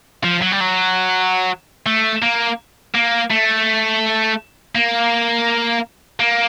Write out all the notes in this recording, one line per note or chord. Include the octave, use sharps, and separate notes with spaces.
F3
F#3
G3
F#3
A3
A#3
A#3
A3
A#3
A#3